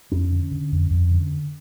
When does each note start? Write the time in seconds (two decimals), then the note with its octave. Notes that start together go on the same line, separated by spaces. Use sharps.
0.12 F2 C#4
0.32 D3
0.51 D3
0.72 F2
0.91 F2
1.11 D3